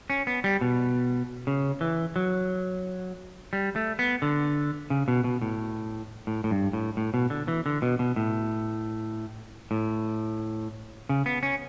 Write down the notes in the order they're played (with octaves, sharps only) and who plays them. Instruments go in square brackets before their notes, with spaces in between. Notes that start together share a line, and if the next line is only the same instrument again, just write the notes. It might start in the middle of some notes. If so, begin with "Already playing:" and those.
[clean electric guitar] C#4
B3
G3
B2
C#3
E3
F#3
G3
A3
B3
D3
C#3
B2
B2
A2
A2
A2
G2
A2
A2
B2
D3
E3
D3
B2
B2
A2
A2
C#3
B3
C#4